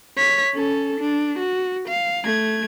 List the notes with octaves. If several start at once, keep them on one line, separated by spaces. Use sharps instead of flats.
C#5 B6
C#4 A4
D4
F#4
F5
A3 G#6